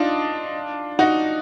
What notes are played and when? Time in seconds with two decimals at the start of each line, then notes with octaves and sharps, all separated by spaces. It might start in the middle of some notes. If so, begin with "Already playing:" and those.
Already playing: D4 D#4 F4
0.99 D#4 F#4